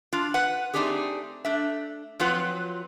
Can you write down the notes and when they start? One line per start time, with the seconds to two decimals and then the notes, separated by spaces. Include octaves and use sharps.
0.13 D4 F4
0.34 B4 F#5
0.74 A3 C4 D4 D#4 G4 G#4
1.45 A3 D4 E5
2.20 F3 F#3 C4 F4 B4 F#5